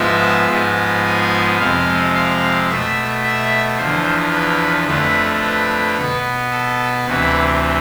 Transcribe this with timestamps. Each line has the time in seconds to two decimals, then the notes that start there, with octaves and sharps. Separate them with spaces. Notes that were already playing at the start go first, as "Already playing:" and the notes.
Already playing: G#2 F3 G#3 B3 E5
0.50 G#2 F3 G#3 B3
1.05 G#5
1.60 F2 C3 G#3 F5
2.14 F5
2.69 B2 A3 E5
3.23 E5
3.77 E2 D3 F3 C5
4.33 B4
4.88 F2 D3 A3 B4
5.42 B4
5.96 B2
6.02 B3
6.51 A4
7.06 D2 C3 E3 B4